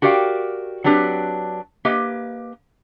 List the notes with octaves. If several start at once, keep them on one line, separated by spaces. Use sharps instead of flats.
F#4 G4 A#4 D5 F5 G5
F#3 C4 D4 G4 B4
A#3 G4 B4 D#5